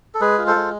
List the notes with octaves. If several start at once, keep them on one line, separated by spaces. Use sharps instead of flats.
A4
G#3 G#4 B4
F4
A4 C5
G#3